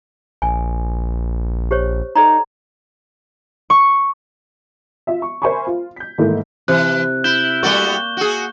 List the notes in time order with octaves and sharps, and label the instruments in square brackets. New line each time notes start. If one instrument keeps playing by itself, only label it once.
[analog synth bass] A#1 [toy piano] G#5
[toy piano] G4 C5 C#5
[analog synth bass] D#4 [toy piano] A4 D5 A#5
[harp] C#6
[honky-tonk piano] F4 E5
C#6
A#4 C5 E5 G#5 B5 C#6
F4
G6 B6
G#2 D#3 E3 A3 A#3 E4
[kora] C3 [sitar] E3 [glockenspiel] F#6
[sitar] E4 [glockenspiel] G6 E7 G7
[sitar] G3 A3 F#4 [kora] A#3 D5 [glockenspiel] C#6 G7
[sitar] F#4 G#4